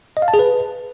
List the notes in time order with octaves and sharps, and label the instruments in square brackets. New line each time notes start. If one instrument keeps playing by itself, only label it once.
[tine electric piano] D#5
F5
A5
G#4
B4